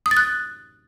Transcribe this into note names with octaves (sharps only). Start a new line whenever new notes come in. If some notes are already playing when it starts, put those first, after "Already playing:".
D#6
A6
F#6